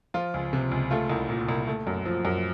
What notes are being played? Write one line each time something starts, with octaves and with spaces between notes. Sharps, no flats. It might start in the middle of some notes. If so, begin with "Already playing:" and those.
F3 F4
C#2
C3
C#2
A3 F4
C2
A#2
C2
A3
F#2
F3
F#2